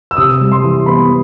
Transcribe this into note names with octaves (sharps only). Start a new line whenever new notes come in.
E6
C3 D#6
G3
C6
E3
B3 B5